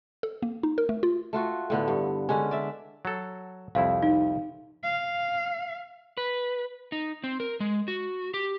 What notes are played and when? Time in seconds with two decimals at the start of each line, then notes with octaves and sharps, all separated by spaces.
0.23 A4
0.42 A#3
0.63 D#4
0.78 A#4
0.89 A3
1.03 F4
1.33 A3 F4 F#4
1.70 A2 D3 B3
1.88 G2
2.29 D3 G#3 C#4
2.51 D5 E5
3.05 F#3 A4
3.75 C2 F2 E4 F5
4.03 D#4
4.83 F5
6.17 B4
6.92 D#4
7.24 C4
7.40 A#4
7.60 G#3
7.88 F#4
8.34 G4